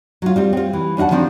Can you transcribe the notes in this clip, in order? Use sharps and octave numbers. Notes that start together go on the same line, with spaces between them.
F#3 F4
G3 C4 F4
C4 F4
E3
D#2 D4 F4 F#5 A5
D#3 F3 C4 D4